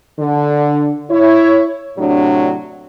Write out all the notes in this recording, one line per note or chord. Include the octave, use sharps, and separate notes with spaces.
D3
E4 C#5
A2 C3 F#3 D4